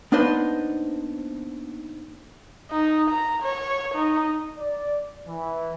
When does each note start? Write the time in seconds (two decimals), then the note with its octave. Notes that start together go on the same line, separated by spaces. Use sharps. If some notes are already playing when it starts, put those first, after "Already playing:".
0.12 A#3 B3 D4 D#4 B4 C5
2.72 D#4
3.10 A#5
3.43 C#5
3.94 D#4
4.58 D5
5.27 E3